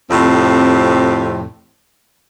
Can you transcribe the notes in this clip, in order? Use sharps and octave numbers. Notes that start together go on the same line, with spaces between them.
F2 A2 C3 C4